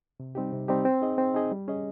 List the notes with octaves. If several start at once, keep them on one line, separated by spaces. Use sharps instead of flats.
C3
G3 C4 D#4 G4
C3
G3 C4 D#4 G4
C4
D#4 G#4 D#5
C4
D#4 G#4 D#5
G3
C#4 G#4 D#5